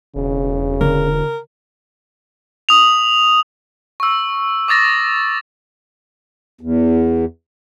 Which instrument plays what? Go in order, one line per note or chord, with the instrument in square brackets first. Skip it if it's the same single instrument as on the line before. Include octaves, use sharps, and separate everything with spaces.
[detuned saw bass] E1 [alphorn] C#3
[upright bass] D3 [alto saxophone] A#4
[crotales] D#6 F7
C#6 E6
D6 D#6 A6 A#6
[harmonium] E2